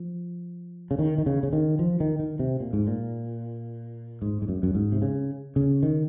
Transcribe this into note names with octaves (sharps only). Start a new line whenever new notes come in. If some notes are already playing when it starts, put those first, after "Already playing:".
Already playing: F3
C#3
D#3
D#3
C#3
C#3
D#3
F3
D#3
D#3
C3
A#2
G#2
A#2
G#2
G#2
F#2
F#2
G#2
C3
C#3
C#3
D#3